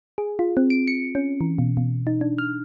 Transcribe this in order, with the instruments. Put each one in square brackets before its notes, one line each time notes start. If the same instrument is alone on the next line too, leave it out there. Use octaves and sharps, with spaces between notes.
[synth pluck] G#4
F4
C4
D7
C#7
C#4
E3
B2
B2
D#4
D4
F6